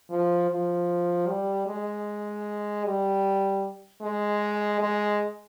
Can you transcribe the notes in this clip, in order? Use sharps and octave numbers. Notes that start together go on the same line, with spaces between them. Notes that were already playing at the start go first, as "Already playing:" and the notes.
F3
F3
G3
G#3
G3
G#3
G#3